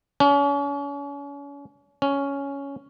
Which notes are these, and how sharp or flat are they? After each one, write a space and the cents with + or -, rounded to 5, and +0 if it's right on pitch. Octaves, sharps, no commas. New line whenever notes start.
C#4 +40
C#4 +10